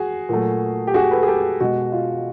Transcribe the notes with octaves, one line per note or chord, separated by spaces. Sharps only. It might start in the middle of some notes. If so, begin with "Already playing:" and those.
Already playing: F#4 G#4
A#2 F#3 A3
G4
F#4 G#4
A4 B4
G#4
G4 A4
B2 G#3 F#4
F4